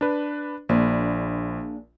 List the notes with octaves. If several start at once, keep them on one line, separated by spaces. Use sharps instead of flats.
D4 B4
A#1 A#3 D4 G#4